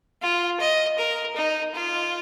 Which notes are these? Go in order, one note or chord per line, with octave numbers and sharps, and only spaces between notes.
F4
D#5
A#4
D#4
F4